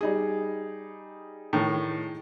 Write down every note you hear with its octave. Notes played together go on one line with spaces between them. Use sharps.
G3 D#4 G#4
A2 D#3